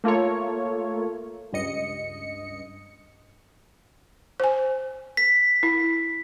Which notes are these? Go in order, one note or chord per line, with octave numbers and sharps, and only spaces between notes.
A3 A#3 F4 A4 C#5
C#2 G2 D#5 C#7
C5 G#5
B6
E4